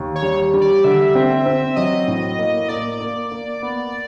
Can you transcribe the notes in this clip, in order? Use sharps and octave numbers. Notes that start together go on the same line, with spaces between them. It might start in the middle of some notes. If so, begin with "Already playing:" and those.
Already playing: D#2
C#5
G3
G3
D5
D3 E5
C4
C4
F#3 D#5
A2
A#3
A#3 D5
A#3
A#3
B3